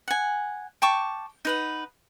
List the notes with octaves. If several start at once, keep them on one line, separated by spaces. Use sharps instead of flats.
F#5 G#5
G5 A5 C#6 D6
D#4 B4 F#5